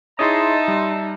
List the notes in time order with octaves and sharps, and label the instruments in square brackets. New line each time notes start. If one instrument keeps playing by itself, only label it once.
[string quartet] D#4 [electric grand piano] E4 G#4 C#5 [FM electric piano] D#5 C6 [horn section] E5 A5
[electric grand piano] G3